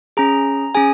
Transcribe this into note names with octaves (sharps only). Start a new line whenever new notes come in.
C#4 G#4 A#5
C#4 G#4 G#5